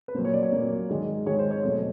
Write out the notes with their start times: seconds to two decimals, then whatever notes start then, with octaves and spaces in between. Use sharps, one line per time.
0.08 B4
0.15 A#2 F#3 A#3 C5
0.25 C#5
0.34 D5
0.43 C#5
0.52 A#2 F#3 A#3
0.89 G#2 D#3 G#3
1.26 G#2 D#3 G#3 C#5
1.39 C5
1.51 C#5
1.63 B2 F#3 A3 C#5